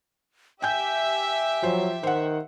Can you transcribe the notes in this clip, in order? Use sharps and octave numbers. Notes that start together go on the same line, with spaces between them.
G4 E5 G5 G#5 G6
F3 F#3 C5
D#3 C5 F#5